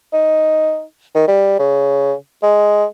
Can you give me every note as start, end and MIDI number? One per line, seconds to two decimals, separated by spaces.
0.13 0.82 63
1.15 1.27 51
1.28 1.55 55
1.59 2.13 49
2.43 2.85 56